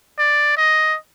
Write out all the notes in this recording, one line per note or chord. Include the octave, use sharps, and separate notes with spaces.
D5
D#5